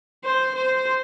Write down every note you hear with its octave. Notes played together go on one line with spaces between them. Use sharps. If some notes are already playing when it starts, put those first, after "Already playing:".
C5
C5